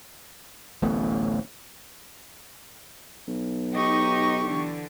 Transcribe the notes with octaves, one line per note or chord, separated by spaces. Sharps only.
D1 A1 A3 B3
B1
D#4 G4 D#5 C#6
D3 E3